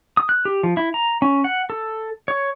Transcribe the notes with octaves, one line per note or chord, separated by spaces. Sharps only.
D#6
F#6
G4
F3
E4
A#5
C#4
F#5
A4
C#5